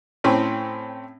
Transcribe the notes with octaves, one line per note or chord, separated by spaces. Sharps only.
A2 C4 C#4